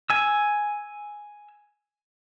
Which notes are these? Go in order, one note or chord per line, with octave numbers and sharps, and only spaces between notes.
G#5 E6